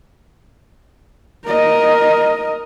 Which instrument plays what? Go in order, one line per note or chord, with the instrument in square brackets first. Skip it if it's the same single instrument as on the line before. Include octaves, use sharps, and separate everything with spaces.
[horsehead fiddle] A#4 D#5